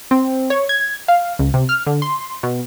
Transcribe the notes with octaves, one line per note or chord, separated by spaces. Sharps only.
C4
C#5
G#6
F5
C#2
C3
F6
D3
C6
B2